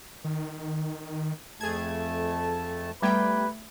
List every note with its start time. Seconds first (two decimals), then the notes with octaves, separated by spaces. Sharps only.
0.24 D#3
1.61 F2 A3 G#4 A5 G#6
3.02 G3 A3 B3 B4 G5 G#6